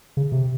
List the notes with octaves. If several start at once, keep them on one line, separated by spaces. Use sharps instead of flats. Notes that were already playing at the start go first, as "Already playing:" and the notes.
C#3
C3